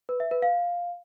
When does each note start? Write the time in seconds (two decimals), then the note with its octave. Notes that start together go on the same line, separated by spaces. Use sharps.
0.09 B4
0.20 E5
0.31 B4
0.42 F5